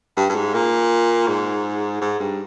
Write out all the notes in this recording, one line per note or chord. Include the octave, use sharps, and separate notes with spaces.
G2
G2
G#2
A#2
G#2
G#2
G2